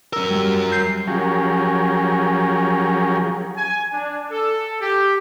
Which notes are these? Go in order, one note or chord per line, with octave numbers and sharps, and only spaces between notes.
F#3 A#4 E6
G3
G6 C7
F3 F#3 C#4 G4 G#4 A#4
G#5
D4
A4
G4